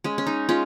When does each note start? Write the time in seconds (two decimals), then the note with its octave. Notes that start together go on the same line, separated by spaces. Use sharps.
0.04 G#3 C#4
0.18 C#4
0.27 D#4
0.49 G#3 C#4 F4